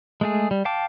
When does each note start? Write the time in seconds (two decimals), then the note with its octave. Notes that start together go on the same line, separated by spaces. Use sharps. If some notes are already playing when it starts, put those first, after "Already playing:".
0.21 G#3 A3 G#4
0.51 G3
0.65 F5 G5 A5 D6